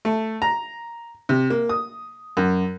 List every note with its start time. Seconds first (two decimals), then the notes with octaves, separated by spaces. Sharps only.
0.05 A3
0.42 A#5
1.29 C3
1.50 A#3
1.69 D#6
2.37 F#2